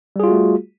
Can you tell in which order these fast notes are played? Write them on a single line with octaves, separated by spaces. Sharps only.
G3 G#4 F4 F#4 A3